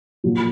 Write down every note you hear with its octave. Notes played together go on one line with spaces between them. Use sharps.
A#2 F#3